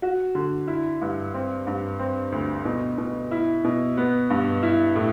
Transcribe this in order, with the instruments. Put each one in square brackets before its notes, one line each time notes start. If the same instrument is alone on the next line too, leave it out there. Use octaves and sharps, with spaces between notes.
[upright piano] F#4
D3
E4
G2
C4
G2
C4
D2
B2
B2
E4
B2
B3
G2
E4
A2